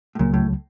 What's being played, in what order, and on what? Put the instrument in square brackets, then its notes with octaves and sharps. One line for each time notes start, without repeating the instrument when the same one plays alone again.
[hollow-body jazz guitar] A2
[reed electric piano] C#2 C#3 F#3 [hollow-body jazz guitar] A#2
[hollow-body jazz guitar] A2